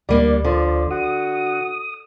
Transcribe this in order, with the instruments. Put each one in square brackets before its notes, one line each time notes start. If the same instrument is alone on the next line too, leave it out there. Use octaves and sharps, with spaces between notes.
[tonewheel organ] D2 D5 [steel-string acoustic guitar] G3 A#3 D4
[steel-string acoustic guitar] D3 [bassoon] F3
[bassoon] F#4 [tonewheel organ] D#6